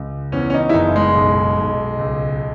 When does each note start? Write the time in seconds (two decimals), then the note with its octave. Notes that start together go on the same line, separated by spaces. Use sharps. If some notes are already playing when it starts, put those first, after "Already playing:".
Already playing: C#2
0.32 E2 C#4
0.50 C#4
0.54 D#4
0.69 E4
0.74 F#1 D#4
0.96 G#3
1.15 B1
1.58 B1
1.99 C#2